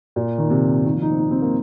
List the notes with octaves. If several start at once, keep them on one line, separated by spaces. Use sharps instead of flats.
A#2
D#3
C3
D#3
F3
D#4
C4
D#4
C4
A#3